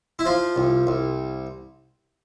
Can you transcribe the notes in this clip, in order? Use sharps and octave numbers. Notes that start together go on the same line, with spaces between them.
E4
F3 F4
C2
C2